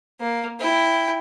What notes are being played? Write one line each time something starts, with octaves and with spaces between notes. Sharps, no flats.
A#3
E4 G5